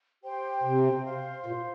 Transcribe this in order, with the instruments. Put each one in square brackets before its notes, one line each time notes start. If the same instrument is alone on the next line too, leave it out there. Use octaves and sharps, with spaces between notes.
[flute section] G4 C5 G5 C6
[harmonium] C3
[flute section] C5 F5 C6
[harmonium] A#2